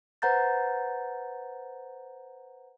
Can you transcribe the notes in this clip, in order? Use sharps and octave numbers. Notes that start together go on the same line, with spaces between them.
B4 C5 F#5 A#5 G6 A6